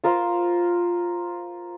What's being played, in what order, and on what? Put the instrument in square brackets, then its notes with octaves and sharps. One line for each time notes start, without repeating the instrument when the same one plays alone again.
[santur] F4 A#4 C5 F5